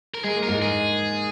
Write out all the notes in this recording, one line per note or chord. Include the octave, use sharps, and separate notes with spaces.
A#4
G#3 G#4
A#3
A#4
G#2 G#3
G#4